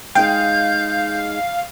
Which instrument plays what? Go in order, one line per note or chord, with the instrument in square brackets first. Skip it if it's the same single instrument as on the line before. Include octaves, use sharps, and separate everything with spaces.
[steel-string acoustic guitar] G#3 D#4 G#4 [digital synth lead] F5 [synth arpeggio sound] G5 [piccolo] G6